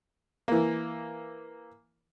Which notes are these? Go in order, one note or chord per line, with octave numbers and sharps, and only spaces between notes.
E3 A#3